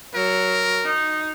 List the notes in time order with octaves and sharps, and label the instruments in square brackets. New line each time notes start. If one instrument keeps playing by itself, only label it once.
[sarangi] F#3 [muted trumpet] A#4
[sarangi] D#4